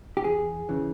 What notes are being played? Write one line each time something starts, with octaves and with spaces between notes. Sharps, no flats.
G4
E2 G#4
C#3 E3